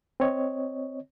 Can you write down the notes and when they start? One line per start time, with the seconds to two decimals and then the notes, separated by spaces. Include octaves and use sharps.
0.20 C4 C#5 D#5